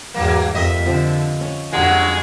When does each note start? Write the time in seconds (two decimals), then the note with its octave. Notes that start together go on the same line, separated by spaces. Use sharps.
0.14 E2 G#2 F#3 A#3
0.55 F2 G4 A#4 D#5 E5
0.86 D3 F3 C4
1.41 C#4
1.73 F2 D3 F#3 G#3 F#4 G4